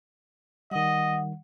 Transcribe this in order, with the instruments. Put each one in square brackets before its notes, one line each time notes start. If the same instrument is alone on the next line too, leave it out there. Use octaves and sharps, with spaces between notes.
[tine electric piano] D#3 G3 [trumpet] D#5 [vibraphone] F#5